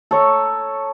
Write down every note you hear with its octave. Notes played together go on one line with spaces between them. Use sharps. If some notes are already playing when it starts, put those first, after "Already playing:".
A4 C#5 A#5